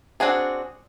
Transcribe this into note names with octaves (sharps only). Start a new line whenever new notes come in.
C4 D4 F#4 G#4 C5